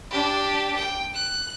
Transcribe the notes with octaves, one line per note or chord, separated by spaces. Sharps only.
D4 G4
G5
F#6